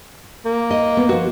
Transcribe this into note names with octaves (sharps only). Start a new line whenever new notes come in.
A#3
D#5
B3
F3 F#4